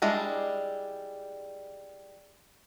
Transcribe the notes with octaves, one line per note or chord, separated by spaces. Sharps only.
G3 G#3 D4 E4